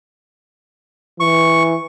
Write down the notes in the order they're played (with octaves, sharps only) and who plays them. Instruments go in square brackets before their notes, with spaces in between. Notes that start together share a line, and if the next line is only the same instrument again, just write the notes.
[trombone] E3 [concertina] C#6